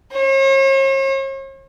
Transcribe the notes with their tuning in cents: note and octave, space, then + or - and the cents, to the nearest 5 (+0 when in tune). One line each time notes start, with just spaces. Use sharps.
C#5 -45